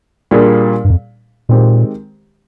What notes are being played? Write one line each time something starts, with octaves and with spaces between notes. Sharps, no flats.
A#2 G3 A#3 D4 G#4
G2
F2
A#2 D#3 G#3 C4 G4